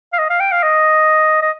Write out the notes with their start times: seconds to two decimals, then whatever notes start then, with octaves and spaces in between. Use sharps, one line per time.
0.13 F5
0.19 D#5
0.30 F5
0.40 G5
0.52 F5
0.63 D#5
1.42 D#5